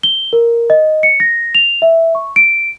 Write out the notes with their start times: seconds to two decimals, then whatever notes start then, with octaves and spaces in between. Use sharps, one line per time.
0.03 G7
0.33 A#4
0.70 D#5
1.03 C#7
1.20 A#6
1.55 F7
1.82 E5
2.15 C#6
2.36 D7